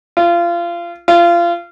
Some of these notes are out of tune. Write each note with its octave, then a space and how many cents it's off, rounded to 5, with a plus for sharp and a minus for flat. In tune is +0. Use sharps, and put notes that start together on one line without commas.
F4 -25
F4 -25